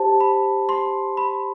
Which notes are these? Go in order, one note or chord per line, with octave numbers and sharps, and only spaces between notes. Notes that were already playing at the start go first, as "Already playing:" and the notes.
Already playing: G4 C5 A5
B5
C6
B5